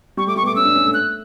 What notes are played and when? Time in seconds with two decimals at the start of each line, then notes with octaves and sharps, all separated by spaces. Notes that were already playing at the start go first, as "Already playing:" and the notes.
0.17 G3 C#6
0.27 A3 D6
0.36 G3 C#6
0.42 B3
0.46 A3 D6
0.56 C#4 E6
0.65 D4
0.75 C#4
0.85 A3
0.94 F#6